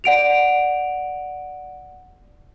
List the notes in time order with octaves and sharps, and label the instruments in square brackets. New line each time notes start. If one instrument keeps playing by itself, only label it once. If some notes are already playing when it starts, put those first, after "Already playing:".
[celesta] D5 F#5 D7 F7